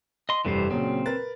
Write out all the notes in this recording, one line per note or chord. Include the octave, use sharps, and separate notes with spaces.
D#5 C6
F1 G2 E3 G3 C5
A#2 C#3 F#3 C4
A#4 B4 A6